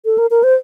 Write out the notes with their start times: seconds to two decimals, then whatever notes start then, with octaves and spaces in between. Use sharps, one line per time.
0.05 A4
0.18 A#4
0.31 A#4
0.43 C5